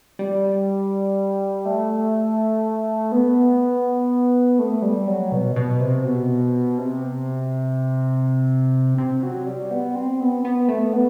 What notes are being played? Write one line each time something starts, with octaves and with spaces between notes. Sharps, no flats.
G3
A3
B3
A3
G3
F#3
B2
B2
C3
B2
C3
C3
F#3
G3
B3
C4
B3
B3
A3
B3